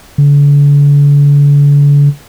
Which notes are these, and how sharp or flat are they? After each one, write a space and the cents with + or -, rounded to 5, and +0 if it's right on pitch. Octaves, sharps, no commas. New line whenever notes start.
D3 -40